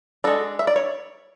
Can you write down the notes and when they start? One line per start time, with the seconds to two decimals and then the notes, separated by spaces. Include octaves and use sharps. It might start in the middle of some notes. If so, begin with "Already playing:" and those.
0.24 G#3 D4 F#4 A4
0.59 E5
0.67 D5
0.76 C#5